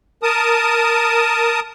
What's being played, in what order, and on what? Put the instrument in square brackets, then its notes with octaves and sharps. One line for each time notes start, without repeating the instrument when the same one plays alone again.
[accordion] A#4 A5 D#6